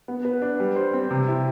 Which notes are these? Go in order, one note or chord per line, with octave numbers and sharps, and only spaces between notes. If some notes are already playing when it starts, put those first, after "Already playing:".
B3
B4
D4
G3
C5
C4
C3
E4